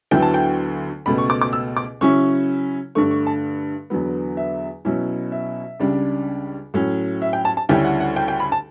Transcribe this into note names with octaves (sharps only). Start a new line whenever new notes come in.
D2 D3 F#3 B3 E4 G5
A5
G5
C#2 B2 A3 B5
C#6
D6
D6
E6
D6
C#3 F#3 C#4 E4 C#6
G2 D3 A3 C#6
C#6
A5
E2 D3 F#3 B3
E5
B2 F#3 C#4 E4
E5
C#2 C#3 G3 D4
A2 F#3 C#4
E5
G5
A5
A5
D2 C#3 G3 C#4 E4 G5
F#5
F#5
G5
G5
B5
A5